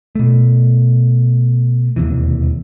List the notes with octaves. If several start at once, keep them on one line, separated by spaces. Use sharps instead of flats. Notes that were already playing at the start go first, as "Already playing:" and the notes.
B2 A3
E1 D#2 C3 E3